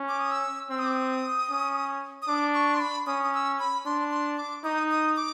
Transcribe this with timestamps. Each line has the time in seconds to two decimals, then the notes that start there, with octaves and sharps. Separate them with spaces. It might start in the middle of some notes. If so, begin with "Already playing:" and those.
Already playing: C#4
0.08 D6
0.20 D#6
0.31 E6
0.70 C4 E6
0.79 D#6
0.86 D6
0.93 D#6
1.50 C#4
2.22 D#6
2.28 D4 D6
2.54 C#6
2.74 C6
2.80 B5
3.07 C#4 D#6
3.23 D#6
3.34 E6
3.60 B5
3.86 D4 C6
4.11 C6
4.38 D6
4.65 D#4 D#6
4.91 D#6
5.17 D6